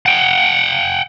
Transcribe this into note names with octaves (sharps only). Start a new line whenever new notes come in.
F#5 G5